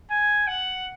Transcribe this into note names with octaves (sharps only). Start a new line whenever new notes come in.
G#5
F#5